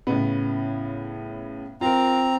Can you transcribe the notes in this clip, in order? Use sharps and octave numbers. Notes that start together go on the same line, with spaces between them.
A2 C#3 B3
C4 F4 A#4 A#5